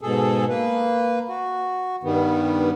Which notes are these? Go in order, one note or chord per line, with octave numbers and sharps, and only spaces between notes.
G#2 B2 G#4 A4
A#3 B4
F#4
G2 D#3 G3 B3